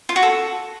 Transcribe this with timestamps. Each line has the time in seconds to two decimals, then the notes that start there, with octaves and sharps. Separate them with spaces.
0.09 F4
0.16 F#4
0.23 A4